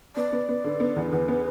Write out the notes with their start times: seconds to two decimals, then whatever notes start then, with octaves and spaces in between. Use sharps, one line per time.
0.16 B3 D5
0.32 B3
0.49 B3
0.64 D3
0.80 B3
0.96 E2
1.12 E2 B4
1.28 B3